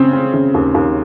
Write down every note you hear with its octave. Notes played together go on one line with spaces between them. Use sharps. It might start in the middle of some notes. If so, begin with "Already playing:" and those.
Already playing: C#3 C4
C4
C#3
D#2
D#2